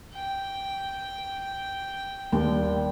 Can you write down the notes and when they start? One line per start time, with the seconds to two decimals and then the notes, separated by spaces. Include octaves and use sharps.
0.13 G5
2.33 D#2 G3